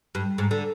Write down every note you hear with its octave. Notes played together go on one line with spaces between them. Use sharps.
G2
G#2
D3